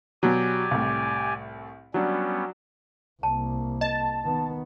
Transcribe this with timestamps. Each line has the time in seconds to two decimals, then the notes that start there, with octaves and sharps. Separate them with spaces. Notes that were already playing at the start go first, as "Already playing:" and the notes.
0.23 B2 F#3 G4 D5 G#5
0.71 C2 A2
1.94 F#3 G3 B3 C#4 D4
3.23 C2 A#3 A5
3.81 D#5 A5
4.22 D#3 B3